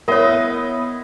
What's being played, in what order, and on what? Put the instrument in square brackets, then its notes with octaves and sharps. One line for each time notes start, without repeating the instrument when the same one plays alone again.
[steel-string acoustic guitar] B3 B4 [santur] E4 D#5 C6 [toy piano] A#4 C#5